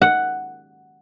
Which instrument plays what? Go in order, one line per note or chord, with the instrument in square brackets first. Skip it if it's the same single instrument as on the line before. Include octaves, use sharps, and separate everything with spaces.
[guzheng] F#5